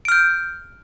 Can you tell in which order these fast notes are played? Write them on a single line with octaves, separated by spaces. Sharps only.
D7 F6 G6